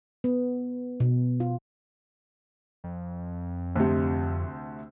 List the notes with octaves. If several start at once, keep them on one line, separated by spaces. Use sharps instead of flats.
B3
B2
F4
F2
D2 C3